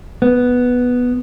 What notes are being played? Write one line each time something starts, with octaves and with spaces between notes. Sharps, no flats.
B3